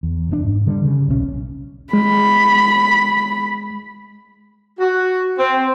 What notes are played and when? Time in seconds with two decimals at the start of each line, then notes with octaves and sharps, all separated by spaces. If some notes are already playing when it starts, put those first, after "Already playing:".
0.03 E2
0.29 F1 A2 D4
0.44 G#2
0.67 D3 G3
0.85 C#3
1.07 D#1 B1 A2 C#4
1.93 G#3 B5
4.80 F#4
5.38 C4